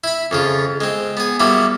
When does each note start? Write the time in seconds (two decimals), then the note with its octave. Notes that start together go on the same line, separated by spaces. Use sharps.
0.04 E4 B5
0.31 F2 C#3 F4
0.81 G#3 C4
1.17 B3 G#4
1.40 F#3 G3 A#3 B3 E4